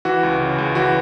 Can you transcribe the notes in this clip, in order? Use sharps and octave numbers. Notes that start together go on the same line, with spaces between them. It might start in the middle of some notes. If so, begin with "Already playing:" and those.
E3 F#4
C#2
C#3
C#2
E3 F#4